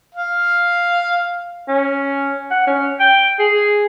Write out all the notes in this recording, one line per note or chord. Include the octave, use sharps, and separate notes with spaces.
F5
C#4
F#5
C#4
G5
G#4